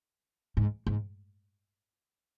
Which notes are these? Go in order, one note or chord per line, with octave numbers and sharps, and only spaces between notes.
G#2
G#2